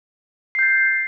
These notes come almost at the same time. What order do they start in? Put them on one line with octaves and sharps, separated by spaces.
C7 G6 A6